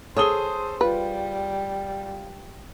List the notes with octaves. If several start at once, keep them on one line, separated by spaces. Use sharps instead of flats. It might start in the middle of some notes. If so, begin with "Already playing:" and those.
G#4 A4 C5 C#5 D#6 G7
G3 F4 B4